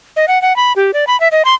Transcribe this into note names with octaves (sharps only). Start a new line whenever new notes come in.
D#5
F#5
F#5
B5
G4
D5
B5
E5
D#5
C6